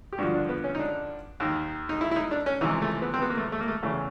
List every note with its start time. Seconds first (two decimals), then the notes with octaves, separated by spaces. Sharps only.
0.13 G4
0.18 G2 D3 F3 F#4
0.34 D4
0.49 B3
0.64 C#4
0.75 D#4
0.79 D4
1.40 D#2 D#3
1.89 D#4
2.01 E4
2.11 E4
2.16 D#4
2.31 D4
2.46 C#4
2.61 C#2 C3 E3 D#4
2.82 A3
3.02 B3
3.14 C4
3.22 B3
3.30 A#3
3.37 A3
3.52 A3
3.61 A#3
3.68 A3
3.83 E2 C#3 E3 A3